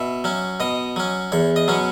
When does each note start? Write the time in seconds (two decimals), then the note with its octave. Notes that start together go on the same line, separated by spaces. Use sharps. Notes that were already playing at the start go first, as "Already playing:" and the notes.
Already playing: B2 E5
0.24 F#3 C#4
0.60 B2 D#5
0.96 F#3 C#4
1.32 E2 C#5
1.56 D#5
1.68 B2 F#3 C#4